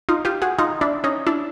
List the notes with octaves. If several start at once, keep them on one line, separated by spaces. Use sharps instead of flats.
D#4 F4
F4 G4
F#4 G#4
D#4 F4
D4 E4
C#4 D#4
D4 E4